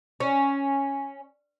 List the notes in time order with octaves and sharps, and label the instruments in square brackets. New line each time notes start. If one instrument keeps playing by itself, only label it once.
[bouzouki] C#4